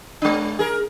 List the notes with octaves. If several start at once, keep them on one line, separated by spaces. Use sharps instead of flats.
G#3 D4
G#4 A#4